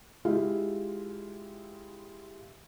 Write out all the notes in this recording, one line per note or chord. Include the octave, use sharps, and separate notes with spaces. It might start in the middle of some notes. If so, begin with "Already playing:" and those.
G#3 E4 F4 G4 F5